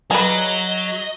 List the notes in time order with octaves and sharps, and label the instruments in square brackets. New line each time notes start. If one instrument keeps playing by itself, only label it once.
[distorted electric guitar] F#3 [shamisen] F4 B4 [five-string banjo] G#4 D5 A#5 [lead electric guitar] D#5